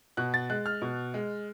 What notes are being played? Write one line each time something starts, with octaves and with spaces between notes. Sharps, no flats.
B2 F#6
A6
G#3 F#6
F6
B2
G#3